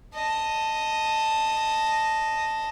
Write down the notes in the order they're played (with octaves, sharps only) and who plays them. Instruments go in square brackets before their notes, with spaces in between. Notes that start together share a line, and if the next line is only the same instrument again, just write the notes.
[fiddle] D#5 A5